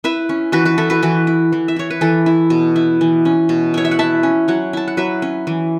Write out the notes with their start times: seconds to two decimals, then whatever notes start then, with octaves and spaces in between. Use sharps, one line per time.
0.04 E4 B4 E5
0.29 C#4
0.52 E3 F#4 B4
0.65 F#4 B4
0.78 E4 A4
0.90 F#4 B4
1.03 E3 F#4 B4
1.27 E4
1.52 E3
1.68 E5
1.76 E4 C#5
1.90 B4
2.01 E3 A4
2.26 E4
2.50 B2
2.76 E4
3.01 E3
3.25 C#4
3.49 B2
3.74 E4 C#5
3.85 E5
3.91 F#5
3.99 E4 E5 A5
4.23 C#4
4.48 F#3 C#5 F#5
4.73 E4 A5
4.88 F#5
4.97 F#3 B4 E5
5.22 C#4
5.47 E3